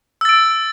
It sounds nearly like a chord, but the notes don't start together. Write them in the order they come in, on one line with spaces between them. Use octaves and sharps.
E6 A6 D7